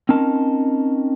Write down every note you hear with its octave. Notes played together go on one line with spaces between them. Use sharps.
C4 C#4 D#4 A#4 A5